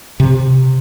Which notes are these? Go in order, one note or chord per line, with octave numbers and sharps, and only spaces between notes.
C3